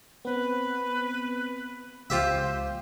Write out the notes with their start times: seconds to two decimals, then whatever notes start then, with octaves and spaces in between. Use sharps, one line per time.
0.25 B3 C4 B4
2.10 C#2 F4 G4 C5 E5